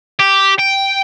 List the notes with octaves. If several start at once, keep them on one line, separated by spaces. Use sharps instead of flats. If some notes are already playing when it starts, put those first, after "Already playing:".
G4
G5